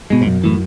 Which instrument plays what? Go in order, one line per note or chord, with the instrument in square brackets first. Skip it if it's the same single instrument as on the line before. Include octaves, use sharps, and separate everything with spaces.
[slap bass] G#2 [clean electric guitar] B2 G#3
[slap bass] G#2
[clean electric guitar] B1 [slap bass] F#2
[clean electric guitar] A2 E3